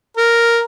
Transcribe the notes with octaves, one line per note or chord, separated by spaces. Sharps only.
A#4